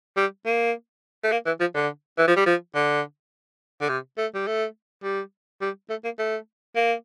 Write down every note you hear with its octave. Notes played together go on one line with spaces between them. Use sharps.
G3
A#3
A3
A#3
E3
F3
D3
E3
F3
G3
F3
D3
D3
C3
A3
G3
A3
G3
G3
A3
A#3
A3
A#3